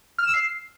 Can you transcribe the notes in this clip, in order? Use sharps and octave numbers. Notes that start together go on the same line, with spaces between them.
F6
E7
E6
C7